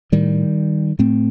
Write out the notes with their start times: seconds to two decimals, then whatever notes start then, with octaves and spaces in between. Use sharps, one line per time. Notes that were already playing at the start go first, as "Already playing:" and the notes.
0.12 A2 D#3 G3
0.99 A2 A3 C4